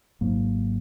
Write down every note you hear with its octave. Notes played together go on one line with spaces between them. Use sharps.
G#1 G#2 F#3 A#3